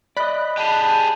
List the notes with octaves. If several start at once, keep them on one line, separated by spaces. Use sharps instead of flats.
D5 D#5 B5 F#6
G4 G#4 A5